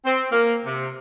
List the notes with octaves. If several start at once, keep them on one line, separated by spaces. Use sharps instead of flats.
C4
A#3
C3